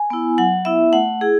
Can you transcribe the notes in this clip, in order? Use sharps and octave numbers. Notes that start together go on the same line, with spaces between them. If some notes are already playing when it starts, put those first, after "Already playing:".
Already playing: G#5
B3 E4
F#3 F#5
B3 E4 E5
A3 F#5
E4 G#4